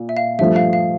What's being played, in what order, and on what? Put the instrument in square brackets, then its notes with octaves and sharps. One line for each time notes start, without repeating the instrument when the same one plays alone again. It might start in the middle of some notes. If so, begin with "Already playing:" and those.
Already playing: [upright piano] A#2
[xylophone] E5
F5
[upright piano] G2 F3 A3 [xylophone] E5
[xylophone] F5
F5